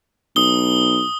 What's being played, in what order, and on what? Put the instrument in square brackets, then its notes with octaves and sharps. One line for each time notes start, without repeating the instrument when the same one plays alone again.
[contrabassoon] B1 [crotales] D#6 G7